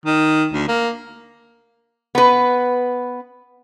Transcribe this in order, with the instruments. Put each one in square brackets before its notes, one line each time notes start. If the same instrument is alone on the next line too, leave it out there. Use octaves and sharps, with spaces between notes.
[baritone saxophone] D#3
D2
A#3
[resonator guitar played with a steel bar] B3 B4